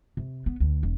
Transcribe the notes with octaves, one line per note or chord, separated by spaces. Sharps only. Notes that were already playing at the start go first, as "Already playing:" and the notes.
C3
B3
D2
E1